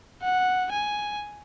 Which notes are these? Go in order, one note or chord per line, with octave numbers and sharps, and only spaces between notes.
F#5
G#5